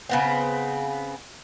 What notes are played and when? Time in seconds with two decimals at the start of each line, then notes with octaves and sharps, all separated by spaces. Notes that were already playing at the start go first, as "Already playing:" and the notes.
0.09 C#3 B3 C4